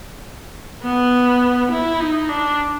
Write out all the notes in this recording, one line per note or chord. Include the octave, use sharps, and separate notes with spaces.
B3
E4
D#4
D4